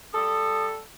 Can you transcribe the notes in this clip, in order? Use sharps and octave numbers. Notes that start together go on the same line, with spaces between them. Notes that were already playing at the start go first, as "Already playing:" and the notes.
G3 A4 D#6